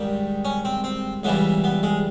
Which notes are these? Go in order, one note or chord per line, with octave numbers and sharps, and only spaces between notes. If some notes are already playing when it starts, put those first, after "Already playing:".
Already playing: G#2 D#3 G3
C#4
C4
C4
C#2 C#3 E3 G3 B3
B3
G#3